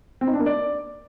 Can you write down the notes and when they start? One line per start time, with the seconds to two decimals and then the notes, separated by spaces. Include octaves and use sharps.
0.21 C4
0.27 D#4
0.34 D4
0.40 A#3
0.46 D5